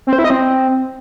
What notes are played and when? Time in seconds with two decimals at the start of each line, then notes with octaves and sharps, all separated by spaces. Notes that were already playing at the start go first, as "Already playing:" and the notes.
0.07 C4
0.13 C5
0.19 E4
0.24 D#5
0.30 C4